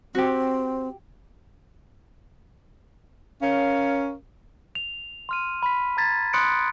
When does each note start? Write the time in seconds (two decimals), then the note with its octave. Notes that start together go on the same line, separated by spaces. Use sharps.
0.15 C4 F#4 G4
3.41 C#4 A#4 C#5 F5
4.75 F7
5.29 C6 F6 D#7
5.63 B5 B6
5.97 A#5 B5 G#6 A6 B6
6.33 B5 C6 D#6 F#6 C#7 D7